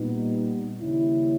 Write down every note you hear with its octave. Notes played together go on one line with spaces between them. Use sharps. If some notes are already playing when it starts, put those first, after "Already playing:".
Already playing: A#2 G3 B3 D#4
D#2 C#3 G3 C#4 E4